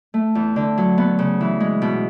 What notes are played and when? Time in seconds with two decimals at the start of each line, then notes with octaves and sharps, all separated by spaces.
0.14 A3
0.35 E2
0.56 D3
0.78 F#3
0.98 B3
1.19 C#3
1.41 E3
1.60 G#3
1.82 B2